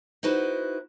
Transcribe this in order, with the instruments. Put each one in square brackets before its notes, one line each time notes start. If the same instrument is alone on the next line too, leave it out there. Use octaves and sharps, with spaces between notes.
[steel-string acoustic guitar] D#4 E4 F#4 B4 C5